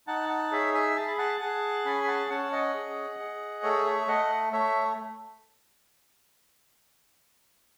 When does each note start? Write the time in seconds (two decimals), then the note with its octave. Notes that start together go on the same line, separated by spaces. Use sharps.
0.07 D#4 F#5 A5
0.29 F#5 A5
0.51 G#4 C#5 E5
0.74 E5 G#5
0.96 G#4 A5
1.07 B5
1.18 F#5 A5
1.40 G#4 F#5 A5
1.85 C#4 G#5 B5
2.04 B5
2.08 F#5 A5
2.30 C#4 F#5 A5
2.52 D#5 F#5
2.74 G#4
3.19 G#4
3.63 A3 A4 C#5
3.85 C#5 E5
4.08 A3 D#5 F#5
4.52 A3 C#5 E5